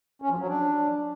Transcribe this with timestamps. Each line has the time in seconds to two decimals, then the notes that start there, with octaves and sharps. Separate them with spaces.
0.22 C#4
0.30 F3
0.39 F#3
0.47 D4